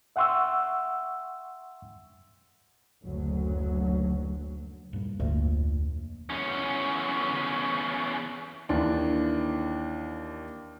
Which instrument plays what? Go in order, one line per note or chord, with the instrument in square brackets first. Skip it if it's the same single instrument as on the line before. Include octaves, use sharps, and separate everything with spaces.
[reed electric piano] E5 F#5 G5 C6 C#6 E6
[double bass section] F#1 D2 F#3
[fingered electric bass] G2 A#2
[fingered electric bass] F1 [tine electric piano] D2 [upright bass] A#2
[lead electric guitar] E2 C#4
[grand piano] D#2 E3 D4